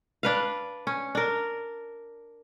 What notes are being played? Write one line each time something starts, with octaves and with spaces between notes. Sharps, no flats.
D4 B4 F5
C#4
D4 A#4